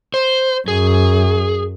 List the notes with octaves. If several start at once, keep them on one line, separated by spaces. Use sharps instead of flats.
C5
F#2 G#4